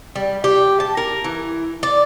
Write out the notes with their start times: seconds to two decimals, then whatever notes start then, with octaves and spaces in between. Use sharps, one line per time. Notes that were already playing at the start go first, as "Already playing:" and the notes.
0.16 G3
0.44 G4
0.80 A5
0.97 A#4
1.24 E3
1.83 D5